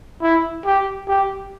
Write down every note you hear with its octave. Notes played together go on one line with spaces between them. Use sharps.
E4
G4
G4